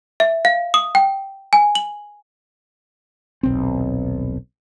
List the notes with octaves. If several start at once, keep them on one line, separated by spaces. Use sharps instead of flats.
E5
F5
D#6
G5
G#5
F#7
D#1 B1 C4